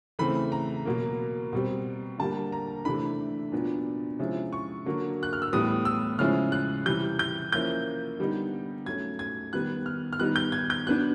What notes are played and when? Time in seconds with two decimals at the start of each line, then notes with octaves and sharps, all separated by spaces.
0.19 C#3 E3 A3 C4 B5
0.52 A#5
0.85 B2 F#3 A#3
1.53 B2 G3 C4
2.18 D3 G3 A#3 A5
2.52 A#5
2.85 C3 E3 A3 D4 B5
3.52 A#2 F#3 B3 D4
4.19 C3 F3 G#3 C#4 E4
4.53 C#6
4.86 D3 F#3 A#3
5.23 F#6
5.33 F6
5.42 E6
5.53 A2 E3 G3 B3 D#6
5.85 E6
6.19 C#3 F3 G#3 C#4 E4 F6
6.52 F#6
6.85 C3 E3 G3 G6
7.19 G6
7.52 F3 A#3 C#4 E4 G6
8.19 D3 G3 B3 D#4
8.86 F#3 A3 C#4 G#6
9.19 G#6
9.53 D#3 G3 B3 F#6
9.86 F6
10.13 F6
10.20 D#3 G3 B3 D#4 F#6
10.36 G6
10.52 G#6
10.70 G6
10.86 F#3 B3 D4 F#6